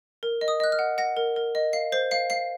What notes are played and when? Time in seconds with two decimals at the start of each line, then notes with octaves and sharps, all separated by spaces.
0.23 A#4
0.41 D#5
0.48 D#6
0.60 D#5 F#6
0.72 F6
0.79 F#5
0.98 F#5 A#6
1.17 A#4
1.36 A#4
1.55 D#5
1.73 F5 C7
1.92 C5 C7
2.11 F5 C7
2.30 F5 C7